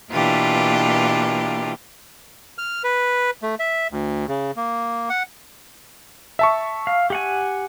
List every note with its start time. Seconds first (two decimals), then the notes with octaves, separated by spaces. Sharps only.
0.12 B2 E3 A#3 D4 F4 G4
2.58 F6
2.84 B4
3.42 A3
3.60 E5
3.92 D2
4.29 C#3
4.56 A#3
5.09 F#5
6.39 E5 A5 C#6
6.87 F5
7.10 G4 F#5 G#5